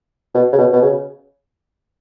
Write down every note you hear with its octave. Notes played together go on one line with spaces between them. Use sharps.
B2
C#3
B2
B2
C#3